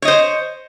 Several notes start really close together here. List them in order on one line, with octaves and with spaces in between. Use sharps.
C#5 D#5 C5